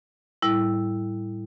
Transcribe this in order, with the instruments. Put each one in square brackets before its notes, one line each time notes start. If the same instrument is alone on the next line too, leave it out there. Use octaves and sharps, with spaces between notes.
[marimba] A2 G3 E4